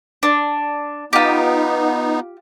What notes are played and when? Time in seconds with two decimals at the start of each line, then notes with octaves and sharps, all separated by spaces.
0.23 D4
1.13 B3 D#4 F4 G4